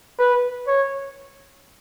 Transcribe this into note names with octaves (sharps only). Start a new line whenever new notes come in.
B4
C#5